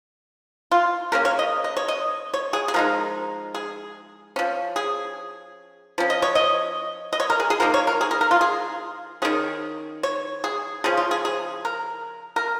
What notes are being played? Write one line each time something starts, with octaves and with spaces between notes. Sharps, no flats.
F4
C#3 A#3 C#4 A#4
C#5
D#5
D#5
C#5
D#5
C#5
G#4
G#4
F3 G#3 D#4 A#4
G#4
F3 C#4
G#4
F3 C#4
D#5
C#5
D#5
D#5
C#5
A#4
G#4
G#4
F3 A#3 D#4 A#4
C#5
A#4
G#4
A#4
A#4
F4
G#4
D#3 C#4 G#4
C#5
G#4
C#3 F3 C#4 G#4
F4
G#4
G#4
A#4
A#4